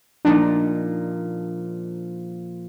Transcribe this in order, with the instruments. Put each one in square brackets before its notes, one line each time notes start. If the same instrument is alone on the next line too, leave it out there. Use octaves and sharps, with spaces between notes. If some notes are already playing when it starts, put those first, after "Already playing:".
[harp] A#2 F3 [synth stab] D4 D#4